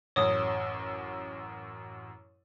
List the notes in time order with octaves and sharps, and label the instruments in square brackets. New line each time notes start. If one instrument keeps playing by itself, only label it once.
[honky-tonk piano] A1 F#2 [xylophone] C#5 D#6